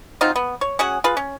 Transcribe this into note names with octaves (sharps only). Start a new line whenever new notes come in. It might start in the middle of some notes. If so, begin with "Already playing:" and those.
F#3 C4 D#4 F4
B3
C#5
C#4 F#4 G#4 F#5
F4 G#4 B4
C#4